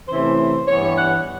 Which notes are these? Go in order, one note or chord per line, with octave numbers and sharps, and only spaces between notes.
C3 E3 A3 C#4 E4 C5
G2 E3 G3 B3 C#5
F#5